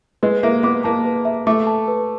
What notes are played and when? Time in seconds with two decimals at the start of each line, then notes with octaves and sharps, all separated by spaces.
0.23 G#3 B4
0.43 A#3 E5
0.63 B3 D6
0.84 A#3 A5
1.06 B4
1.25 E5
1.47 A3 D6
1.67 A5
1.88 B4